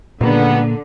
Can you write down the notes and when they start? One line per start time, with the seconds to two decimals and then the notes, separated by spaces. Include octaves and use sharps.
0.21 C#2 A#2 D3 G3 A#3 B3